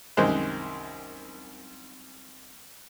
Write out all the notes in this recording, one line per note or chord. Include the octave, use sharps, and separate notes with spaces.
C2 F#2 D#3 G#3 C5 F#6